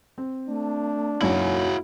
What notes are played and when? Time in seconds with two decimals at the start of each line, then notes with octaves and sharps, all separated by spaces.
0.18 C4
0.48 A3 D4
1.21 F#1 F#2 D#4 E4 F#4 C#5